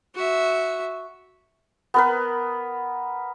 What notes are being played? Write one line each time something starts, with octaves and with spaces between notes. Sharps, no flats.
F#4 E5
B3 A#4 B4